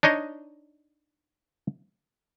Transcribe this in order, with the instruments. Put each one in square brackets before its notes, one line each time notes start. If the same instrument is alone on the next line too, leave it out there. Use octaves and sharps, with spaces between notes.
[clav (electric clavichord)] D4 D#4 C#5 D#5